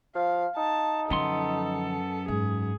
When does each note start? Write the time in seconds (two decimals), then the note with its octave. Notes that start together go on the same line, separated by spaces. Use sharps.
0.15 F3 F5
0.57 D#4 A5
1.10 F#2 D3 F3 B3 A4 C6
2.28 G#2 G#4